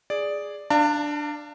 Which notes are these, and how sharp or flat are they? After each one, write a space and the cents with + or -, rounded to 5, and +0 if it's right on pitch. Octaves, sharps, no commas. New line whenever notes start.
G#4 +0 D5 +0
D4 +5 F5 -20 A5 +45